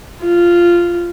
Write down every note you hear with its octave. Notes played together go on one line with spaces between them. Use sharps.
F4